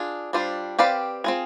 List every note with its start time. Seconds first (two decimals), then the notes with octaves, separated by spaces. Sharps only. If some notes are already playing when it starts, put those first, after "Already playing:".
Already playing: D4 F4 G#4
0.33 G3 D4 F4 C5
0.79 C4 G4 B4 D5 F5
1.24 C4 F4 G#4